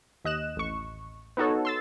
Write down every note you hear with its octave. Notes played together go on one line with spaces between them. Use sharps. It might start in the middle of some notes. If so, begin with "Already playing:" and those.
D#2 D#5 F#6 E7
A1 C#6
B3 D#4 F#4 A4 C#5
C6 E6 A6